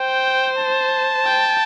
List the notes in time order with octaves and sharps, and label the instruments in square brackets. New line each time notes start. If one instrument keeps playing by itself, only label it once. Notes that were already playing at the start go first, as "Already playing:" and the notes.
Already playing: [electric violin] C5 [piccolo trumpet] G5
[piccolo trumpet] A5
[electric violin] G5